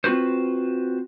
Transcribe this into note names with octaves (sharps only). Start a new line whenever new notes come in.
C4 F4 F#4 B4 C5